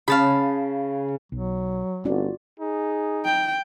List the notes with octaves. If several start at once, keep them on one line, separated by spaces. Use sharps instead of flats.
C#3 F5 A5 B5
B1 F#3
G1 C4 C#4 F4 F#4 D5
D#4 G#4
G5